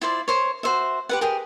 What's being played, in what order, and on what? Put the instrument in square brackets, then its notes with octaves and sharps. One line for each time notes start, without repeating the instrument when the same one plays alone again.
[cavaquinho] E4 F4 C5 D5
A#4 C5 C#5
F#4 C5 E5
G4 B4 F#5
G4 G#4 A#4